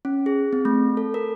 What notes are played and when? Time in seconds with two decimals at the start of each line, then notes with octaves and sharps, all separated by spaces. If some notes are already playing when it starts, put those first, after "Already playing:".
0.05 C#4
0.26 G#4
0.53 C4
0.65 A3
0.97 A4
1.14 A#4